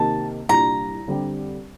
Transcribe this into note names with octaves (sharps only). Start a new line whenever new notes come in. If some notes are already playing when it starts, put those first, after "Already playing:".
Already playing: C3 D#3 A#3 D#4 A5
C2 A#2 G3 D4 A#5
D3 G3 C4 G4